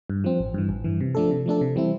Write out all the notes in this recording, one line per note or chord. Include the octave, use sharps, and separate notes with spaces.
G2
F3 C4
A1
G2 E3
A1
G2 E3
C3
F3 A3 D4 A4
C3
F3 A3 D4 A4
C3
E3 G3 C4 E4